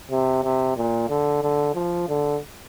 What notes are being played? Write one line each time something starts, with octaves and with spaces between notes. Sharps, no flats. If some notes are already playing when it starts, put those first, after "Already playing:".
C3
C3
A#2
D3
D3
F3
D3